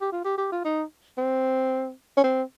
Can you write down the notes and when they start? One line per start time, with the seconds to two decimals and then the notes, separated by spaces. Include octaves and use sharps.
0.01 G4
0.12 F4
0.25 G4
0.38 G4
0.52 F4
0.64 D#4
1.18 C4
2.17 C#4
2.24 C4